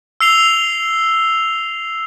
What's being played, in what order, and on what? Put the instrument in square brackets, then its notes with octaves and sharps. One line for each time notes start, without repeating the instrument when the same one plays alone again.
[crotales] E6 C7 F7 G7